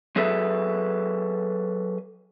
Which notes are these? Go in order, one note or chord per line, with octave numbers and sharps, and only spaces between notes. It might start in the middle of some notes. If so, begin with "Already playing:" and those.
F#3 G#4 A4 B4 E5